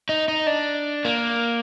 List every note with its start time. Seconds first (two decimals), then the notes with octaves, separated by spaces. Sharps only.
0.09 D#4
0.28 D#4
0.47 D4
1.05 A#3